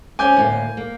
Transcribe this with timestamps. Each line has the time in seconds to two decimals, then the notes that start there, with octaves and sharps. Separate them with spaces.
0.19 C4 C#4 G#5 D6 G6
0.37 D2 A2 A#3
0.77 A#3